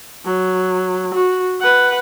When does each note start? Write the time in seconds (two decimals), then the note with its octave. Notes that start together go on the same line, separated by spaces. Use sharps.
0.25 F#3
1.14 F#4
1.60 B4 F#5